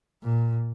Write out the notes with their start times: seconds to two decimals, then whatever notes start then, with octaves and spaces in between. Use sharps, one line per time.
0.23 A#2